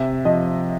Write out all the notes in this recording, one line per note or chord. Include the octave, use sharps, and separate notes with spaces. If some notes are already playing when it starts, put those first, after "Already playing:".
Already playing: C3 E5
F3 D#5